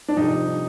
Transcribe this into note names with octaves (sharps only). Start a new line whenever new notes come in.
D4
F2 C3 G3 D#4